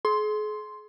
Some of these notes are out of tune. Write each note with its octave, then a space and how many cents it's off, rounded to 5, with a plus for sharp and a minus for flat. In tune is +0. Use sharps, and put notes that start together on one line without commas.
G#4 +40 C6 +0